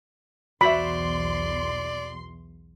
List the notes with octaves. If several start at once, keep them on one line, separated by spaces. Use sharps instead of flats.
B1 E2 F#4 C5 D5 E5 B5 C6